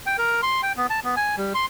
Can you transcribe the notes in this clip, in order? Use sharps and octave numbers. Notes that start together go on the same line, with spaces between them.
G5
A#4
C6
G5
B3
A5
B3
G#5
G3
C6